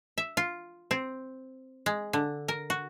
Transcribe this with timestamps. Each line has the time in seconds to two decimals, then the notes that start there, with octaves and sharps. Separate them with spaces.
0.18 E5
0.37 F4
0.91 C4
1.86 G#3
2.13 D3
2.48 A#4
2.70 F#4